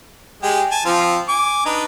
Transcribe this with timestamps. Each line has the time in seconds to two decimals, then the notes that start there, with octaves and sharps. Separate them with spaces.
0.43 G#3 G4 G#4
0.71 G#5 A5
0.85 F3 C4 F4
1.28 G#5 D6
1.65 D4 D#4 B4